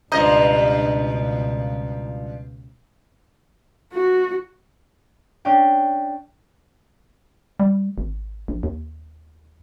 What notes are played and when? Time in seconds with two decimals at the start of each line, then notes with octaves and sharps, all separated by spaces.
0.12 C#2 G2 B2 F3 D#5 A#5 G6
3.93 F#4
5.45 C#4 D4 G5
7.60 G3
7.98 G#1
8.48 A#1
8.63 D#2